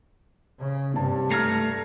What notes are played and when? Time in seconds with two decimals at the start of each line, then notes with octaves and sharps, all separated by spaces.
0.58 C#3
0.94 G2 C3 A5
1.30 A3 A#5 F6 G#6 C7